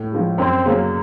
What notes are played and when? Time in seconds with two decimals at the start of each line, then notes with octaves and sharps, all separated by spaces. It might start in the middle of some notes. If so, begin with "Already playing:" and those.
Already playing: A2
0.12 F3 G#3
0.38 F#2 C4
0.65 C#3 F#3 A#3 C#4